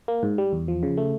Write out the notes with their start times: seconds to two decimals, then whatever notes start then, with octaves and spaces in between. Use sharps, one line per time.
0.08 A#3
0.23 G#2
0.38 G3
0.53 E2
0.68 F3
0.83 C#3
0.97 A3